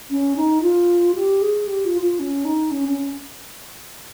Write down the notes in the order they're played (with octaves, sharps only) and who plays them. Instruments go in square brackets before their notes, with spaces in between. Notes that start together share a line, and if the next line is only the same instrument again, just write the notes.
[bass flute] C#4
D#4
F4
G4
G#4
G4
F4
F4
C#4
D#4
C#4
C#4